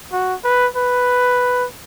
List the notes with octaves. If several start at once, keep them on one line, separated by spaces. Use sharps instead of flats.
F#4
B4
B4